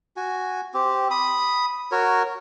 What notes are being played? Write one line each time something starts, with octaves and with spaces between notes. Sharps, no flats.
F#4 G#5
C4 G4
B5 D#6
F#4 A#4 C#5